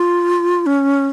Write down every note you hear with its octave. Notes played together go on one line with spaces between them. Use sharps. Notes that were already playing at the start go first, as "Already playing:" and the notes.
Already playing: F4
C#4